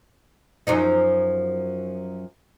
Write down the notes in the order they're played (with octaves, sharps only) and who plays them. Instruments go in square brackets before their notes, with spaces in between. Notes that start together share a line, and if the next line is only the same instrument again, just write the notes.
[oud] F#2 F3 D#4